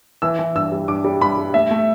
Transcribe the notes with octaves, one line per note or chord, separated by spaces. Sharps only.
E3 E6
E3
G2 E6
G3
G2 D6
G3
G2 B5
G3
A3 E5
A3